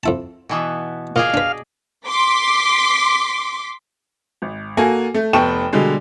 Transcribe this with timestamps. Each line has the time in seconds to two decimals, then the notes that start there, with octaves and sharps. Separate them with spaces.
0.03 F2 E4 A5
0.49 B2 E3 B3
1.16 A#2 G#4 D5 D#5 F5
1.34 D4 B4
2.07 C6 D6 B6
4.42 G#1
4.77 A#3 F#4 A4 G#5
5.14 A3
5.33 F1 B3 G5 A5 C#6 E7
5.73 B2 D3 G3 G#3